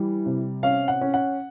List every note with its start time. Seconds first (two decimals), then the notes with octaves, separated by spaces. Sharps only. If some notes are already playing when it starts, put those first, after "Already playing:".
Already playing: E3 G3
0.26 C3
0.63 C#4 F5
0.88 F#5
1.01 C#4
1.14 F#5